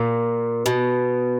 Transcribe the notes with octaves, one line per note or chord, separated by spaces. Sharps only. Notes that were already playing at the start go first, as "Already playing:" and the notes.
Already playing: A#2
B2